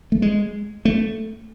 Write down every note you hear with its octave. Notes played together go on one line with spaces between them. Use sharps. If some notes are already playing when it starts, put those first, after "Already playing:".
A3
G#3
A3